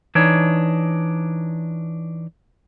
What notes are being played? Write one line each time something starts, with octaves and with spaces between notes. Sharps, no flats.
E3 D4 D#4 C#5